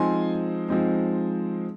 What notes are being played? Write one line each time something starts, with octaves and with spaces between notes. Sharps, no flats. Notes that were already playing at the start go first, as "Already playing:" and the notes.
Already playing: F3 G#3 C4 D#4 G#5 C6
F3 G#3 C4 D#4